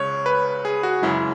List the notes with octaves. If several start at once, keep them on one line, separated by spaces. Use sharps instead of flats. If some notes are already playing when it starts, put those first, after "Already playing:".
Already playing: C#2 C#3 G#3 C#5
B4
G#4
F#4
F#2 C#3 G#3 E4